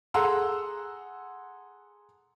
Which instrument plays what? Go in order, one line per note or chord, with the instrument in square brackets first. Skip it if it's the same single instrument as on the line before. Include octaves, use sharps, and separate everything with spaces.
[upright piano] G#4 A4 F#5 A#5 C6 E6